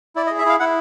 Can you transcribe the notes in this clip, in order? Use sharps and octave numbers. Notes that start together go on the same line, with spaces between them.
E4 D5
D#5
G#4
E5
E4 F5
E4 F#5